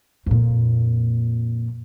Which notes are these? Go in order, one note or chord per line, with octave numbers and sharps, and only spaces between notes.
F2 A#2